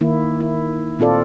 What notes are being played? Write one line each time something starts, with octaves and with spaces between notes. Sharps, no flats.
D#3 A#3 E4
E4
A#2 C4 F4 A4 D5